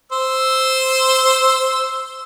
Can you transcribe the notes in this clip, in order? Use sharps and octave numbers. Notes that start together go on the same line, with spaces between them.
C5 E6